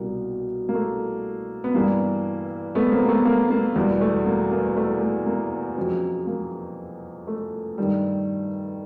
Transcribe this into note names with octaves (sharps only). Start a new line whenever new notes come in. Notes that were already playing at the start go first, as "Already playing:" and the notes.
Already playing: C2 B2 G3 A#3
A#3
A3
B3
G2 E3 G3 A#3
A3 B3
A#3 C4
A#3
A3 B3
A#3
A#3
E2 B2 G3
A3
A#3
A#3
A3
A3
A#3
F2 C#3 F#3
A#3
A3
G2 D#3 G3